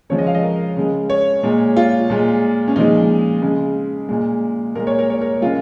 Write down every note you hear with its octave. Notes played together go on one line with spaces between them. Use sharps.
C#3 F3 G#3 C#5
D#5
F5
D#5
A#4
C#3 G#3
C#5
A#2 G#3
F4
A#2 G#3
C#4
A#2 F3 G#3 D#4
C#3 G#3
A#2 G#3
A#2 G#3 A#4
C#5
A#4
C#5
A#4
C#3 G#3 F4